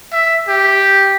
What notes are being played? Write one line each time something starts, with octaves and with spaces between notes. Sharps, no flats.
E5
G4